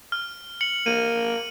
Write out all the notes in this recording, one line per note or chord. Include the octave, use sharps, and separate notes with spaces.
F6
C#7 F#7
A#3 D#7